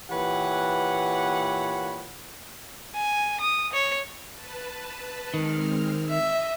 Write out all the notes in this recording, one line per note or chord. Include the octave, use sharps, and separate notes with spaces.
A#2 E3 G4 B4 C#5 F#5
G#5
D#6
C#5
B4 A5
D#3 G#3 C4 F6
D#5 E5